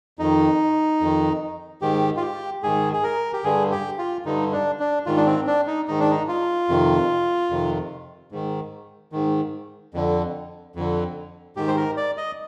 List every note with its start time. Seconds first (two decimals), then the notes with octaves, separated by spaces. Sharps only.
0.19 F2 D#3 D#4
1.01 F2 D#3
1.82 G#2 D#3 G4
2.17 F4
2.22 G4
2.63 G#2 D#3 G#4
2.93 G#4
3.03 A#4
3.33 G4
3.44 G2 D3 G#4
3.71 G4
3.98 F4
4.25 G2 D3 D#4
4.52 D4
4.80 D4
5.06 G#2 D#3 F4
5.17 D4
5.26 C4
5.47 D4
5.67 D#4
5.88 G#2 D#3 D#4
6.00 D4
6.11 D#4
6.29 F4
6.69 F2 C3 D#3
7.50 F2 C3 D#3
8.32 G#2 D#3
9.12 G#2 D#3
9.94 F2 D3
10.75 F2 D3
11.56 G#2 D#3 G4
11.68 C5
11.77 A#4
11.97 D5
12.17 D#5